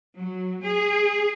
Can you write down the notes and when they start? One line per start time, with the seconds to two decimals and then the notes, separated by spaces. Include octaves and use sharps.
0.17 F#3
0.64 G#4